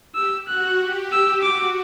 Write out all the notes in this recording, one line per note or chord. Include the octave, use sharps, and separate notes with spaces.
G4 E6
F#4 F#6
G4
E6
F#4 D6